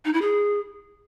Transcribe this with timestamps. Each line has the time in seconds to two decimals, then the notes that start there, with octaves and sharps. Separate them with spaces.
0.05 D#4
0.13 E4
0.22 G#4